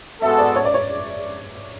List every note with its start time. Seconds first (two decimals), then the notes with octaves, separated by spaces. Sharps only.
0.21 G#3 B3 F#4 A4 E5
0.38 D5
0.56 C#5
0.65 D5
0.74 C#5